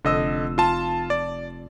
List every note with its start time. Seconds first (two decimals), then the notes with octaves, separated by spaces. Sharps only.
0.05 F1 D3 D#5 E6
0.58 F4 A5
1.10 D5